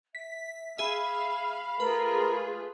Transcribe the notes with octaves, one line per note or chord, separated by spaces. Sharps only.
E5 B6
G#4 E5 F5 B5
A3 F4 G#4 A#4 B4